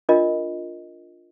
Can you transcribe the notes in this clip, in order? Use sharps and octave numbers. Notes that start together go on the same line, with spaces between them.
D4 F4 A#4 D#5